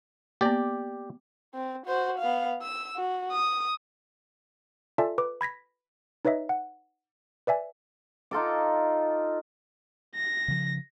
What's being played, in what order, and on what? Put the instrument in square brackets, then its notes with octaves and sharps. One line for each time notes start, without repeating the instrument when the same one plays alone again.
[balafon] A#3 B3 [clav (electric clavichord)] G4 D5
[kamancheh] C4
F#4 C5
B3 F5
E6
F#4
D#6
[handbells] F4 A4 D5 E5 G#5 A5
B4 D6
B5 G#6 A#6 B6
D#4 B4 C#5 D#5 E5
F#5
B4 D5 E5 G#5
[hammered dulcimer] D#4 F4 A4 D6
[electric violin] A#6
[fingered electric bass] C#3 F3